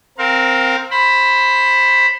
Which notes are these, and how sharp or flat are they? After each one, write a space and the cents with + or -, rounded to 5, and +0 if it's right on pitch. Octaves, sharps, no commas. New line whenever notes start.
C4 +0 A#4 +0 F5 +25
C5 +15 B5 +5